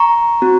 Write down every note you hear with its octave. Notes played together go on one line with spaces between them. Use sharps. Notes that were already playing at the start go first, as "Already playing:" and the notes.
Already playing: A#5 C#6
C4 F#4